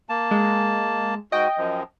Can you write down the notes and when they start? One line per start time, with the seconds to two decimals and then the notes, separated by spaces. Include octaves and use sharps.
0.09 A#3 A5
0.31 G#3
1.32 G#2 F#4 D#5 G5
1.58 F#2 F3